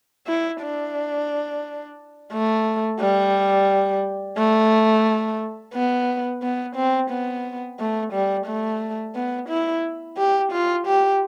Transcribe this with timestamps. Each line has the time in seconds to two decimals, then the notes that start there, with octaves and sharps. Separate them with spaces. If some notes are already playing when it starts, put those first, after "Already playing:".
0.27 E4
0.62 D4
2.33 A3
3.00 G3
4.37 A3
5.74 B3
6.42 B3
6.76 C4
7.10 B3
7.79 A3
8.13 G3
8.47 A3
9.15 B3
9.49 E4
10.17 G4
10.52 F4
10.87 G4